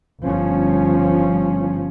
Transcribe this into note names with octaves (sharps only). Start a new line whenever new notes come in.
G1 F3 C#4